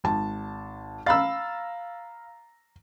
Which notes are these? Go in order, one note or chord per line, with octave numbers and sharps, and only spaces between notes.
G#1 A5
F5 A#5 B5 E6 A6